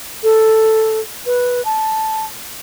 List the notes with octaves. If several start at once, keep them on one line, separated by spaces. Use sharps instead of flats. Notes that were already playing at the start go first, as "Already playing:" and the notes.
A4
B4
A5